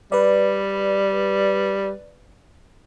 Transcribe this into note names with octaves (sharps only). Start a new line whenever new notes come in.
G3 B4 D5